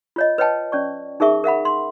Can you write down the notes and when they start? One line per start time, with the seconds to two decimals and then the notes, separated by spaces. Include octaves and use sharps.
0.16 F4 C#5 D#5
0.38 B4 C#5 D#5 G5 A5
0.72 C#4 D5 C#6
1.20 D#4 G#4 A#4 E5 C#6
1.44 A#4 E5 F#5 B5
1.65 C6